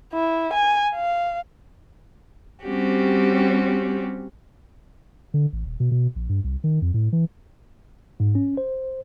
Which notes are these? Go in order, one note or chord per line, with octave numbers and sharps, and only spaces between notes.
E4
G#5
F5
G3 C4 C#4 F#4 G4
D3
A1
D#1
B2
B2
A#1
G2
C2
D#3
F2
A2
E3
G#2
C#4
C5